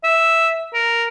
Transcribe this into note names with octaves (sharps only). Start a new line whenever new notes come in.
E5
A#4